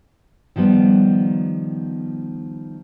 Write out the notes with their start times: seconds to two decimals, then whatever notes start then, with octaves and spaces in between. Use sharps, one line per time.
0.56 D#3 F3 G3 B3